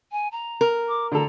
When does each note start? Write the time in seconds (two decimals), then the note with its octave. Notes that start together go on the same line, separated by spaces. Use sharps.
0.12 G#5
0.32 A#5
0.61 A#4
0.88 D6
1.12 D3 A4 A#5